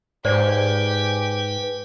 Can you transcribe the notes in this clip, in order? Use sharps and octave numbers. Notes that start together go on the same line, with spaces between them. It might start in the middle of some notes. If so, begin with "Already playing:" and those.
G#2 G4 B4 C5 D5 G#5